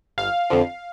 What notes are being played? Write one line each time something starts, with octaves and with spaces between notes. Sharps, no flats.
G1 F5
F2 D3 F3